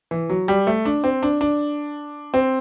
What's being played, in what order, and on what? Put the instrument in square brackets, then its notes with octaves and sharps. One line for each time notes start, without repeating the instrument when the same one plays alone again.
[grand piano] E3
F#3
G3
A3
D4
C4
D4
D4
C4